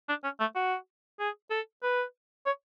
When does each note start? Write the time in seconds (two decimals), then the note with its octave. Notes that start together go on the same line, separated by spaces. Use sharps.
0.09 D4
0.24 C#4
0.40 A3
0.55 F#4
1.19 G#4
1.51 A4
1.83 B4
2.46 C#5